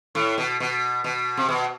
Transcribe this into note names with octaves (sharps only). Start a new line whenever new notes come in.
A2
B2
B2
B2
C3
B2